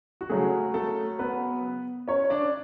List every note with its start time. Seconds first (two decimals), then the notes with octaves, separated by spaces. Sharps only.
0.21 F#4
0.29 C#3 F#3 A3 G#4
0.74 A3 A4
1.19 B3 B4
2.08 C#4 C#5
2.30 D4 D5